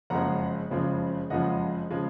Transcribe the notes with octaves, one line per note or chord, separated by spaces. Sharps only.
F#1 F2 C#3 F3 G#3 F#5 A#5
F#1 F2 C#3 F3 G#3
F#1 F2 C#3 F3 G#3 D#5 F#5
C#3 F3 G#3